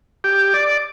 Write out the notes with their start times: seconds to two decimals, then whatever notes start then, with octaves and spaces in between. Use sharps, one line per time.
0.24 G4
0.54 D5